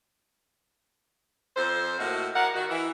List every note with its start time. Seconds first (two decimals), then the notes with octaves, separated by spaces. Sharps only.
1.57 F2 A4 C5
1.99 A2 G#3 A#3 F#4
2.36 F#3 A#4 D5 F#5
2.54 D#3 F#4
2.69 E3 E4